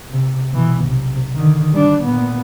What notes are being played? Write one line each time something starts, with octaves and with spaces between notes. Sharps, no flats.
C3
B2 E3
B1 C3
D3 D#3
G3 D4
A#2 B3